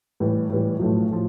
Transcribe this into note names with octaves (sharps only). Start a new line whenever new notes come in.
A2 E3 G3
A2 E3 G3
B1 A2 F3 A3
A2 F3